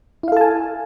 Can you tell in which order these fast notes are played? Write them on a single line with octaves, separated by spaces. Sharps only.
E4 F5 A4 A5 G#5